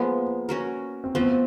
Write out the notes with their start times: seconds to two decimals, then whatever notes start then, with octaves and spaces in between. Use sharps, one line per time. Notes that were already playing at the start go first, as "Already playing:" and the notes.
Already playing: F3 G#3 A#3 B3
0.49 C#4 F#4 A#4
1.04 C4
1.15 F3 A3 B3 C4